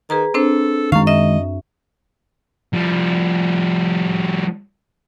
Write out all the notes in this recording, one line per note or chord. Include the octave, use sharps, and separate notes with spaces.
D#3 G#4 B4 A#5
C4 D4 A4 C5
F#2 D#3 G#3 F5 C#6
D#5 E5
F3 G3